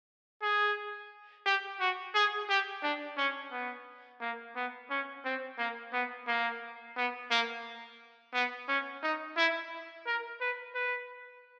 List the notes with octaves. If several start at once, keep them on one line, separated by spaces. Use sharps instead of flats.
G#4
G4
F#4
G#4
G4
D4
C#4
B3
A#3
B3
C#4
C4
A#3
B3
A#3
B3
A#3
B3
C#4
D#4
E4
A#4
B4
B4